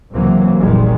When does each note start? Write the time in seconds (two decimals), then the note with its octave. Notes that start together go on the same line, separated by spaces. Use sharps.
0.13 C#2 C3 E3 F#3 A#3
0.59 F1 B1 A#2 D#3 G3 G#3